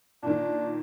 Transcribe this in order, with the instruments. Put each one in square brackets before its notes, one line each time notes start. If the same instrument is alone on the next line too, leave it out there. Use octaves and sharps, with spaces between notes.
[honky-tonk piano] A#2 D#3 [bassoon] D4